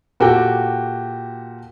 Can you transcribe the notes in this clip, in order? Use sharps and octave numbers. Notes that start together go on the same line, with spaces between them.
A#2 F#4 G4 A4 G5